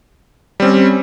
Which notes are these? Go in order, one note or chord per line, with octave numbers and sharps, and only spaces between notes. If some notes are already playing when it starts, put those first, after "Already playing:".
G3 C4 C#4